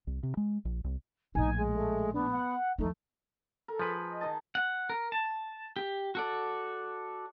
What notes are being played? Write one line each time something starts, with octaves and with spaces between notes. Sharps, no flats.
C2
C3
G#3
A#1
C2
A#1 A2 D#4 G#5
G#3
A3
B3 D4
F#5
E2 F3 A3 D#4
A4 A#4
F3 G#4 B4 B5
D#5
D#3 A5
F#5
A#4
A5
G4
F#4 A4 D5